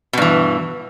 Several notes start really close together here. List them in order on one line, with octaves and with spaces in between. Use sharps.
B2 G2 E3